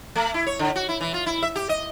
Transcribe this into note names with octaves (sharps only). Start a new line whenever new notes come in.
A3
E4
C#5
D3
F#4
E4
E3
F4
E4
E5
G4
D#5